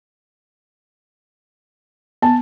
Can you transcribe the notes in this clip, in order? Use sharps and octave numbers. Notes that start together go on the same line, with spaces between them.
B3 A5